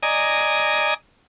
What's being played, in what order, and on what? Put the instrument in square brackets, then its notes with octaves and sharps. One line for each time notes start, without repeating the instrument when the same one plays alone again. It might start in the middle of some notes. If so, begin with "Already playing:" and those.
[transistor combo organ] D5 D#5 G#5 A#5 D#6